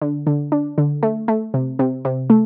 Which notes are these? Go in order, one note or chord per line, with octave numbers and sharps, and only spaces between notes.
D3
D3
D4
D3
A3
A3
C3
C3
C3
A3